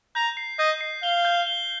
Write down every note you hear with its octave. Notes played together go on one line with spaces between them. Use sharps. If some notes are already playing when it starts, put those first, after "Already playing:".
A#5 G6
C7
D#5 G6
C7
F5 G7
G6
G7